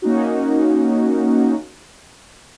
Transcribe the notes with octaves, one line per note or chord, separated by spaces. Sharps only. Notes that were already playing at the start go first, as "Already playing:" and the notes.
A#3 C#4 D#4 F#4